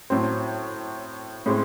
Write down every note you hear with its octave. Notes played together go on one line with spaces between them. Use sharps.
A2 F#3 C4
A2 G#3 C4